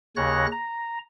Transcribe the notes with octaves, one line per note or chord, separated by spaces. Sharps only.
D#2 C#3 C#5 F#6 A#6
A#5